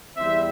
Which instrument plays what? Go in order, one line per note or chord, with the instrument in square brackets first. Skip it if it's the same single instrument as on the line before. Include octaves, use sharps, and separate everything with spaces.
[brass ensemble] E2 E3 G3 C4 C5 E5